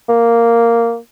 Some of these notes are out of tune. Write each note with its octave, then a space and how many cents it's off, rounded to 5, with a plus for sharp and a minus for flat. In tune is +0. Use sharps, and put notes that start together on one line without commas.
A#3 -5